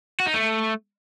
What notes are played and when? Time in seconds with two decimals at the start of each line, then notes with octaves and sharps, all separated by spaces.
0.20 F#4
0.27 D#4
0.34 A3